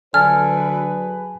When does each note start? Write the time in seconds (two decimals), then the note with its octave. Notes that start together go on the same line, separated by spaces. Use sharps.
0.14 D3 F#3 G#4 B4 G#5 A5 F6